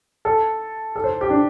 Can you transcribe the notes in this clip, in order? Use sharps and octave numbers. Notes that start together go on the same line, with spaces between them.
A4
A4
C5
G4
D4